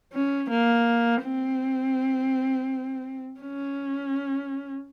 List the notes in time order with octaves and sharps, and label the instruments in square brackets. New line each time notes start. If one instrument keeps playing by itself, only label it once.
[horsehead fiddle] C#4
A#3
C4
C#4